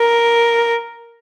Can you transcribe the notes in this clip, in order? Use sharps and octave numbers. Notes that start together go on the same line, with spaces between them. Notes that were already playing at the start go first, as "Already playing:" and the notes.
Already playing: A#4